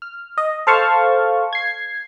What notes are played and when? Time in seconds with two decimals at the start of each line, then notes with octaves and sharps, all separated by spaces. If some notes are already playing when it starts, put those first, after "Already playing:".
0.02 F6
0.38 D#5
0.67 A4 C5 F5 A5 C#6
1.53 G#6 C7